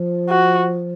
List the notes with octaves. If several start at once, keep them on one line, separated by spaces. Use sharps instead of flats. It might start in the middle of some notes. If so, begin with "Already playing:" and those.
Already playing: F3
F#4